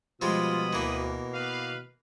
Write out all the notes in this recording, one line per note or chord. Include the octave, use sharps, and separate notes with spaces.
B2 F3 G3 G#3 F4 B5 D#6
D2 E3 A#3
B3 B4 F5